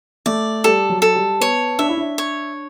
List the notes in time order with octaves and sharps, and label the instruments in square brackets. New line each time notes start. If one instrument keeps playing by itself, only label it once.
[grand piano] A3 [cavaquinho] D5
[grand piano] G3 [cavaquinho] A4
[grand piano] F#3
[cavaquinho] A4
[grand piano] G3
[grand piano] B3 [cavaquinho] C#5
[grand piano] D4 [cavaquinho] E5
[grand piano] E4
D4
[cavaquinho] C#5